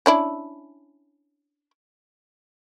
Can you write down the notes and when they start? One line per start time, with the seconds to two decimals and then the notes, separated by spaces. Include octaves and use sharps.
0.06 C#4 D4 E4